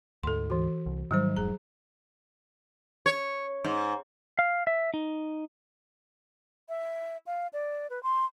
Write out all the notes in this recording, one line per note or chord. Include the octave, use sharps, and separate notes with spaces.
D2 G#2 A4 C6
E3 F#4
C2
G#2 D#3 F#3 G3 C5
F1 G#2 G#4 A#5
C#5
G#2
F5
E5
D#4
E5
F5
D5
B4
C6